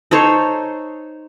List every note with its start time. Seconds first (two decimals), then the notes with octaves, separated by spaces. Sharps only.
0.11 D#4 A4 C5 C#5